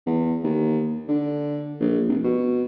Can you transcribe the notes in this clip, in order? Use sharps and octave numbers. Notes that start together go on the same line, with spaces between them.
E2
D#2
D3
A#1
F1
B2